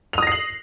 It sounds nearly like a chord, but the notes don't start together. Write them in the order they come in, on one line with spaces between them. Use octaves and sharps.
F7 D#6 A#6 C7 F#7